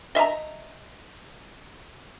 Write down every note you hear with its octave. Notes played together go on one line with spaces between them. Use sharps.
D#5 E5 A5 A#5